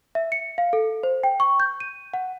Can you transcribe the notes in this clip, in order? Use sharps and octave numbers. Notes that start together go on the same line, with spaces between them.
E5
C#7
F5
A4
C5
G5
C#6
G6
D#7
F#5